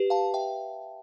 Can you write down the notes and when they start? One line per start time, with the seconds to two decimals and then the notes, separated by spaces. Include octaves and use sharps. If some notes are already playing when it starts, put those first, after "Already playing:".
Already playing: G4 B4
0.10 F5 A5
0.34 E5 G5